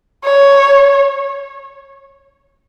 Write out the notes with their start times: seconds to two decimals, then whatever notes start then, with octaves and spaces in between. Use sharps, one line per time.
0.25 C#5